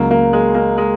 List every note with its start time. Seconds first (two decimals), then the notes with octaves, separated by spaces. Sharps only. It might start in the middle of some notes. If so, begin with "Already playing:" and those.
Already playing: C#2 C#3 F#3 A#3
0.11 A#3
0.33 G#3
0.55 A#3
0.78 G#3